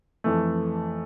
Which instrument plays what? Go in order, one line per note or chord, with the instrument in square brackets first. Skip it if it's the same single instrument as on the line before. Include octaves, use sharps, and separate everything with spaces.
[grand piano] F2 E3 A3